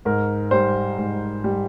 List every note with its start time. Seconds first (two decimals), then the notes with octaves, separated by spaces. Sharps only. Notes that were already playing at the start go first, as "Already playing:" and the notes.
0.05 G#2 A#4
0.51 G3 C5
0.98 G#2
1.44 G3